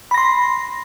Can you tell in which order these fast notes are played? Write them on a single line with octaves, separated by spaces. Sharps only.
B5 A#6 C6